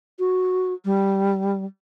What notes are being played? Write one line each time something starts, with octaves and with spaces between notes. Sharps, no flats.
F#4
G3